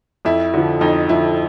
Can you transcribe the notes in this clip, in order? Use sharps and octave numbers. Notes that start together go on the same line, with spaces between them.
F2 E4
D3 F3
F2 D#4
D3 F3 E4